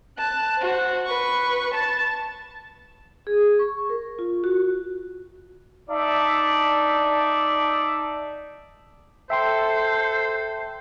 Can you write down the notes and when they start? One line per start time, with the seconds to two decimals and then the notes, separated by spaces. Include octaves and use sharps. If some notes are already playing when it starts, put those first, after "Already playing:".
0.18 A5 F#6
0.58 F#4 C5
1.06 B4 C#6
1.74 A5 A6
3.27 G#4
3.59 C#6
3.90 A#4
4.19 F4
4.44 F#4
5.90 D#4 D5 E5 A5
9.30 A4 C5 E5 G5 C6